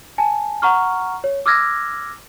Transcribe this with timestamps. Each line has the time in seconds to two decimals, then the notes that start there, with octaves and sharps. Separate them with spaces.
0.18 G#5 A5
0.62 F#5 A#5 C#6 F6
1.24 C#5
1.46 D6 E6 F6 G#6 A#6